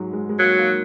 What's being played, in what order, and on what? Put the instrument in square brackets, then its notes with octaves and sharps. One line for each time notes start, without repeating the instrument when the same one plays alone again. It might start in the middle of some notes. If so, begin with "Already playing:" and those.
Already playing: [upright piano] G#2 F#3 G#3
G#3
G#3
[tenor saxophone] F#3 [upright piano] A#3
[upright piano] A#3